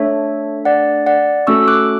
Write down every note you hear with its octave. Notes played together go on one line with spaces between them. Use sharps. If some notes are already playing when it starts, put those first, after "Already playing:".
Already playing: A3 D4 A4 C#5 E5
D5 F#5
D5 F#5
A3 C#4 F#4 A4 C#6 E6
D6 F#6